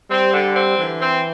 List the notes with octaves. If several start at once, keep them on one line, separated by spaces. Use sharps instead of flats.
G3 C4
D3
C4
D3 E3
C4